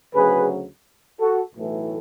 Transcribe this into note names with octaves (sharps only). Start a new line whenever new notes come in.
D2 C#3 F#3 G#4 B4
F#4 A4
B1 A2 E3 A3